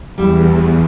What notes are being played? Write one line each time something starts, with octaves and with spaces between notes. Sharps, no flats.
E2 G3 E4